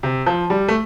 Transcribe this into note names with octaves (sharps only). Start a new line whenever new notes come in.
C3
F3
G3
A3